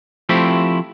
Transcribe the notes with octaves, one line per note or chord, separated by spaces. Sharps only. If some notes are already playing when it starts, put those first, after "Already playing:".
F3 A3 C4 E4 G4